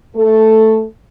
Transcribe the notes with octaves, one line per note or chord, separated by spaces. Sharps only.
A3 A4